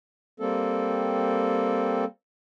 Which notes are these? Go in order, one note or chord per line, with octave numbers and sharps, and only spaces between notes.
G3 A#3 C4 A4